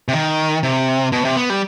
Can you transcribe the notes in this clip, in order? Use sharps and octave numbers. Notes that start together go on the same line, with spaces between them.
C3
D#3
C3
B2
C3
B3
G3